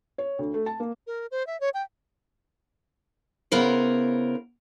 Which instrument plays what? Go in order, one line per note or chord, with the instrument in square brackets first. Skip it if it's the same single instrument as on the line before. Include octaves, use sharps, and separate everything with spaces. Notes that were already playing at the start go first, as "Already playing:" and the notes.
[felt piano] C#5
D2
A3
A5
A#3
[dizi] A#4
C5
E5
C#5
G5
[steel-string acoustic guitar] C#3 B3 E4 A#4 C5